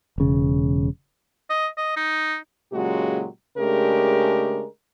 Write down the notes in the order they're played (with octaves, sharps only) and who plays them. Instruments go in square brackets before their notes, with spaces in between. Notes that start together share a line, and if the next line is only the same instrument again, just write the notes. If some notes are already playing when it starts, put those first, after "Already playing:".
[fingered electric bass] E1 C#3
[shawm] D#5
D#5
D#4
[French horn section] A#2 C#3 F#3 G#3 F#4 G4
C#3 G#3 A3 D4 G4 A#4